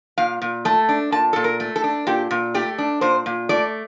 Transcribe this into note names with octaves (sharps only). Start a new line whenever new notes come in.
A#2 F5
A#2
A3 A5
D4
A#2 A5
A#2 A4
A#4
A3
A4
D4
A#2 G4
A#2
A3 G4
D4
A#2 C5
A#2
A3 D5